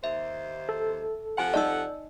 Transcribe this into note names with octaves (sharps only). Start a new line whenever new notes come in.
D#2 C5 E5
A4
C3 F3 F#5 G#5
D#4 D5 D#5 E6